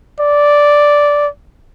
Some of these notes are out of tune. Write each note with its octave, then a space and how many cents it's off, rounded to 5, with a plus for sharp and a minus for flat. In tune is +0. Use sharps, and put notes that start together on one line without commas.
D5 -5